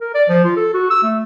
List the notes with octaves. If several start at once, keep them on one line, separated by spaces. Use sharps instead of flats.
A#4
D5
F3
F4
A4
F#4
E6
A3